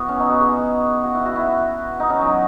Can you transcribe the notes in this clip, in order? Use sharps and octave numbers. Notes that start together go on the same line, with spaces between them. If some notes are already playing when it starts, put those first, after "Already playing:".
Already playing: B3 E4 F#4
C#4
D#4
F#4
G#4
F#4
E4
F#4
E4
D#4
C#4
F#3